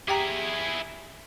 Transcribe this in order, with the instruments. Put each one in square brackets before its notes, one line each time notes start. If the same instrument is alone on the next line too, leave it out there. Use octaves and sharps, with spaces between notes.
[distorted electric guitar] E4 G#4 [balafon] G4 G5 A#5